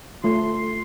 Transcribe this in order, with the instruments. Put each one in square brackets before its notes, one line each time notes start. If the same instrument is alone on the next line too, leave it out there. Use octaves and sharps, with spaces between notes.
[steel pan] A3 F4 [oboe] C6